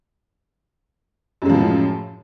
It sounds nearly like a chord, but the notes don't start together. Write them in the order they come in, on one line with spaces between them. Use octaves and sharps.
F#2 G#3 F3 A2